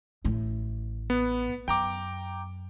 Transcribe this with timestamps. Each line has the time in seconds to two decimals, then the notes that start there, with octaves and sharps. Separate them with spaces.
0.25 A1 A2
1.10 B3
1.68 F#2 G5 A#5 D6